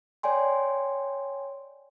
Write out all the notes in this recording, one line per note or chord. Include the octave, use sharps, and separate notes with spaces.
C#5 D5 G5 G#5 C6